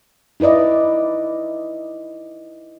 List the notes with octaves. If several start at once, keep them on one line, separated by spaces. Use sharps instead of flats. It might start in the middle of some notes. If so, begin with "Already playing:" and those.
D#4 E4 B4 D5 D#5